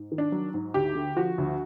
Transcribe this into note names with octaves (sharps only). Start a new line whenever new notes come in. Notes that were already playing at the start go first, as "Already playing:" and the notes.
Already playing: G#2
D#3
D4
F#3
G#2
D2 G4
D3
F3 F#4
D2